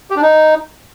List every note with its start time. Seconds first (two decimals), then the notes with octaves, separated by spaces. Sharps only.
0.10 G4
0.16 D4
0.22 D#4